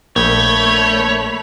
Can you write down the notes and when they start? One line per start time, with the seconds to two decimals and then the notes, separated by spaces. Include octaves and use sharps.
0.16 A#1 A3 A#3 C#5 B5 G6